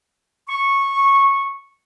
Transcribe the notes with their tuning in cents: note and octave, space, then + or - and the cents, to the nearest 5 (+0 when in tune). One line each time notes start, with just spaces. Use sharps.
C#6 -10